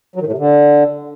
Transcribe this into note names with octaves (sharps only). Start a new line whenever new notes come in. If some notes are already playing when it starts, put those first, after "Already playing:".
F#3
D#3
A2
C3
D3